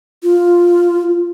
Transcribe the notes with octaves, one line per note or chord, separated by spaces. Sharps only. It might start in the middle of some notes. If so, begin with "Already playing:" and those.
F4